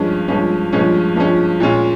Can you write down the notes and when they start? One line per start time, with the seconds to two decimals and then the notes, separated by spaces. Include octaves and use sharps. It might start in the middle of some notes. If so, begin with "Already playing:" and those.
Already playing: G2 F3 G#3 C#4
0.28 G2 F3 G#3 C#4
0.73 G2 F3 G#3 C#4
1.16 G2 F3 G#3 C#4
1.60 A#2 G#3 C#4 F4